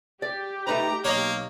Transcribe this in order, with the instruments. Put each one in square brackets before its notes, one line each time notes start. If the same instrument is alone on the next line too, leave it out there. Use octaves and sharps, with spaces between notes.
[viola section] G4 [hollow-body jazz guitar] D5
[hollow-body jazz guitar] A3 D#4 B4 [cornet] A#5
[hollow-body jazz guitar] B1 [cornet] A#3 [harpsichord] C#5 D#5